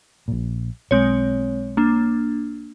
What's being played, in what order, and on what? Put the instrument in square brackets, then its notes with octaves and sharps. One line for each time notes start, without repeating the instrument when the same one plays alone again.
[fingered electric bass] A#1 A#2
[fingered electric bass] B1 [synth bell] G#3 C4 C#5
[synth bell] A#3 D4